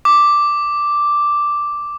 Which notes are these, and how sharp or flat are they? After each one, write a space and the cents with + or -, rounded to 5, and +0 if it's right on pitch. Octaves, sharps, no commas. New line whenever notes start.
D6 +0